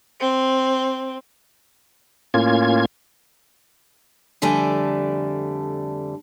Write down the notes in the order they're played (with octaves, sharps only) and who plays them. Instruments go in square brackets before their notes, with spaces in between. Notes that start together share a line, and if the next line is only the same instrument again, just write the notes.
[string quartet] C4
[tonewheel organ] A2 A#3 C#4 F4 G#6
[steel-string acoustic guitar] F2 D3 G3 A3 D5 G#5